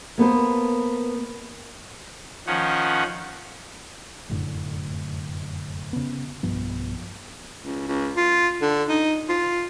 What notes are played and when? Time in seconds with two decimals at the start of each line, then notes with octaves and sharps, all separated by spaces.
0.18 A#3 B3 A4 C5
2.47 D#3 F3 C#4 F#5
4.30 F1 F#2 A2 D3
5.93 C#3 B3
6.43 B1 G2 F3 B3
7.61 C#2
7.87 C#2
8.17 F4
8.62 D3
8.89 D#4
9.29 F4